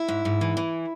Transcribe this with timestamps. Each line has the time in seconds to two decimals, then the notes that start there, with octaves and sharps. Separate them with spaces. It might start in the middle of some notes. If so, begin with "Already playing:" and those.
Already playing: E4
0.08 G#2
0.25 G#2
0.41 E3
0.57 E3